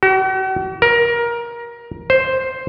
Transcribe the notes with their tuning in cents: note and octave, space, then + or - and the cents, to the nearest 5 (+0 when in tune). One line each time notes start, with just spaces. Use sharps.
F#4 +45
A#4 +20
C5 +5